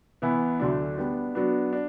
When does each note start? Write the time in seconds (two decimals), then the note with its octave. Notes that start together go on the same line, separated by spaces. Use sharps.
0.22 E3 B3 E4
0.60 D2 D3 F#3 A3 D4
0.98 G3 B3 D4 G4
1.35 F#3 B3 D4
1.73 D4